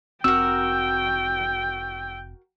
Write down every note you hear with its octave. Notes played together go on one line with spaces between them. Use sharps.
F1 C4 F#4 A#4 G5 E6